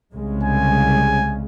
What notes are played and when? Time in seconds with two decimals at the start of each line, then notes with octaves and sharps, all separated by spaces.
0.13 C2 C#3 G#3
0.44 G#5